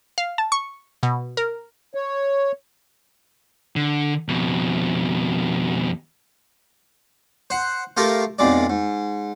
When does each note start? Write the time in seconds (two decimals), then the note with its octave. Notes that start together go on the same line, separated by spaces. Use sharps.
0.18 F5
0.38 A5
0.52 C#6
1.03 B2
1.37 A#4
1.95 C#5
3.76 D3
4.28 F2 B2
7.50 C5 F#5
7.97 A3 F4 G4 A4 A#4 F5
8.39 B1 F2 G#3 D5
8.70 G#2